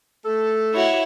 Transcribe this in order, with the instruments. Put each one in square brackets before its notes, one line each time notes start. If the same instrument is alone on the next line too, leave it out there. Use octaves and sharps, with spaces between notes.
[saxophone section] A3 A4
[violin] E4 E5 [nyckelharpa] F#4 C#5